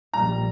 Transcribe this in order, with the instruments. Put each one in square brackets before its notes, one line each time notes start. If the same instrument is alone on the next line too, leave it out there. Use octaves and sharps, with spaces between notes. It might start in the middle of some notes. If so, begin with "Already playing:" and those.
[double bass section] A#1 A#2 G3 [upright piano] A#5